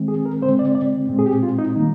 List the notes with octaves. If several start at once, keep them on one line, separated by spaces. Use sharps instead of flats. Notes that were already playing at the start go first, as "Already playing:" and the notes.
Already playing: D#3 G#3 C4
G#4
A#4
D3 G#3 C4 C5
D5
D5
A#2 G#3 C4
G#4
G4
F4
D#4
D#3 G3 A#3 D#4